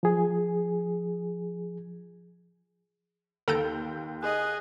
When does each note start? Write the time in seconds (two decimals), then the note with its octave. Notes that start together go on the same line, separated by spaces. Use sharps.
0.03 F3 G#4
3.48 D#2 A4 A#5 G6 D7
4.22 G#4 D#5 F#6